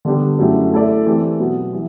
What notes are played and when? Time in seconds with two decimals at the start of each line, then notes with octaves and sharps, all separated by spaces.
0.05 D3 G3 B3 D4 G4
0.38 F#2 F#3 A3 E4 G4
0.72 A3 E4 A4 D5
1.06 E3 A3 C4 G4
1.39 B2 F#3 B3
1.73 E3 G3